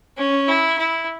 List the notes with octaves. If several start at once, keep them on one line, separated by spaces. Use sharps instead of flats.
C#4
E4
E4